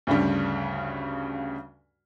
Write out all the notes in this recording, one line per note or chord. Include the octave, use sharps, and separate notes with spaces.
D2 G2 C#3 G3